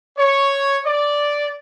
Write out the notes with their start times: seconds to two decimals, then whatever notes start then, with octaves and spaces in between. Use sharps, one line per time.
0.17 C#5
0.85 D5